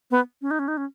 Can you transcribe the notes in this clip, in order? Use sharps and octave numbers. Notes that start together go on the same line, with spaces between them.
B3
C#4
D#4
C#4
D#4
C#4